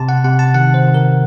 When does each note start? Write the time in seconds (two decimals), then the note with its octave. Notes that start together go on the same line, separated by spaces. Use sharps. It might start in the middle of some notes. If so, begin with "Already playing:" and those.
Already playing: C3 A5
0.09 F#5
0.24 C3 F#5
0.39 A5
0.54 D#3 F#5
0.74 C5
0.84 D#3
0.94 A#4